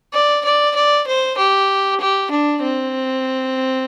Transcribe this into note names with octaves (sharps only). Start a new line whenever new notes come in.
D5
D5
D5
C5
G4
G4
D4
C4